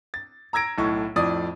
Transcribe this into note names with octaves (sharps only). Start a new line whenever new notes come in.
A6
A#5 E6 G#6 A#6 D7
B1 A2 C#6
F2 A2 D5 D#6